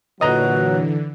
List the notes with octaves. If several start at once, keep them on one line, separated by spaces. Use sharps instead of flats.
A#2 D3 E3 F#3 B4 D#5 A#5